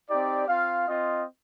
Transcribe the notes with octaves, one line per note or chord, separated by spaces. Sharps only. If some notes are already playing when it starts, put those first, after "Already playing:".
C4 D#4 G4 D5
C4 F4 F5
C4 F4 D#5